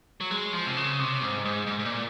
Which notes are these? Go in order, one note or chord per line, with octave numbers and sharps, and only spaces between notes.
F#3
G#3
F3
C3
C#3
C3
G#2
G#2
G#2
G#2
A#2